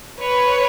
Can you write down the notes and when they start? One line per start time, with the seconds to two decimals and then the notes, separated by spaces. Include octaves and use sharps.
0.21 B4 C#5